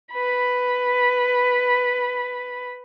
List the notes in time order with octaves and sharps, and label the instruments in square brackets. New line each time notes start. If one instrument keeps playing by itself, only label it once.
[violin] B4 B5